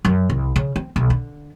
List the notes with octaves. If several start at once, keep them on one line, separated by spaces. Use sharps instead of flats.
F#2
C2
C#3
C4
B1
D3